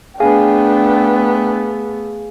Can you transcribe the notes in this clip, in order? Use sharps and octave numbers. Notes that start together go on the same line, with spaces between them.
A3 B3 D4 G#4 F5 G5 G#5